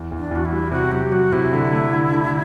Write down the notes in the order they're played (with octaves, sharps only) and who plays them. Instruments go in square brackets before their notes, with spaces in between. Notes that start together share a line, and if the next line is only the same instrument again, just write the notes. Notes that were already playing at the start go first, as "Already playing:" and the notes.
Already playing: [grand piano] E2
E2
[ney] D4
[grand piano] E2 [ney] F#4
[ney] E4
[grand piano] G3
[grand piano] C3 [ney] F#4
[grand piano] F#3 [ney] G4
[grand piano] F#3 [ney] F#4
[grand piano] C3 [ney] E4
[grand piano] D3
A3
D3
D3